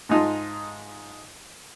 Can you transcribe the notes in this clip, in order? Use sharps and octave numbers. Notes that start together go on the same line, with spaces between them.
G#2 G#3 D#4 F4 A5